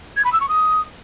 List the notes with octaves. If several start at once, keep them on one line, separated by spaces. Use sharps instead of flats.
G#6
B5
E6
C#6
D#6